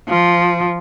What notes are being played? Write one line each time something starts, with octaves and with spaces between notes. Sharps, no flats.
F3